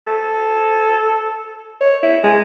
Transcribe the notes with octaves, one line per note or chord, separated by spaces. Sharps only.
A4
C#5
E4
G#3